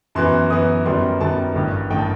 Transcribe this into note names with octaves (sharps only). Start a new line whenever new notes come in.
F#2 E3 B3 C6
F#2 E3 B3 D#6
F#2 D#3 G3 B3 C6
F#2 D#3 G3 B3 A5
A1 G2 D#3
A1 G2 D#3 G5
A5